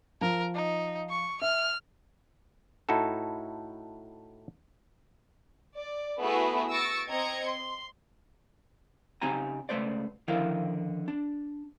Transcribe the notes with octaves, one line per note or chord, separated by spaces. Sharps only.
F3 A#4
D#4
C#6
E5 F6
A2 D#4 E4 F#4 A4
D5
A3 B3 E4 F#4 G#4 B4
C#6 E6 A6 A#6 C#7 D7
C4 D#5 A#5 G#6 C#7
C6
C#3 C4 D#4 G4 G#5 A#5
C#2 F3 A3 B4 C5 D5
D3 D#3 F3 E4 A#4 F5
D4